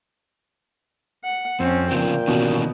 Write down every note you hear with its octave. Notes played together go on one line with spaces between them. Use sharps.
F#5
F2 C4 C#4
A#2 C#3 F3 B3 G5
B2 D#3 E3 C#4